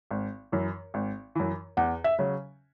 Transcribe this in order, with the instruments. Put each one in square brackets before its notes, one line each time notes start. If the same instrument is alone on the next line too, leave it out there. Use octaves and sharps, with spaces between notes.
[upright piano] G#1
F#2 E3
G#1
F#2 E3
[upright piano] E2 [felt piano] F#5
[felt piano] E5
[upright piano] C#3 F#3 C#4